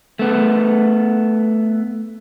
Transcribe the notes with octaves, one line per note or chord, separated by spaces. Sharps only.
A3 B3